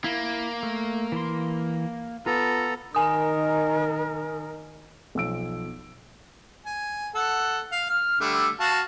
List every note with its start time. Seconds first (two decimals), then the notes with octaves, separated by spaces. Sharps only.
0.04 A#3 E4
0.63 A3
1.12 E3 C6
2.26 B3 F4 A4 A#5
2.95 D#3 D#4 A#4 G#5 D#6
5.15 B1 F3 E6 D7
6.66 G#5
7.15 A4 F#5
7.72 F5
7.90 F6
8.21 D3 G3 A3
8.60 F#4 F5 A5